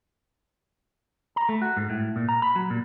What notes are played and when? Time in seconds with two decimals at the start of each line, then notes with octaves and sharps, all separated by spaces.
1.36 A#5
1.49 A3
1.62 F#4
1.77 G#2
1.90 A2
2.16 A#2
2.29 A#5
2.42 B5
2.56 F#3
2.70 A#2